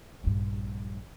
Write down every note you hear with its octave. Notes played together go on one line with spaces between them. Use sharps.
A#1 G2